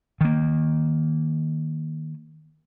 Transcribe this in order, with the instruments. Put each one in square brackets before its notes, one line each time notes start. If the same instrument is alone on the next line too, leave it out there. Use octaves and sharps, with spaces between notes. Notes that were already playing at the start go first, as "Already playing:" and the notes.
[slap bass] D#3 A#3